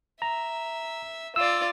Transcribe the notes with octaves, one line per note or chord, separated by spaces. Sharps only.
E5 A#5
F4 D5 E6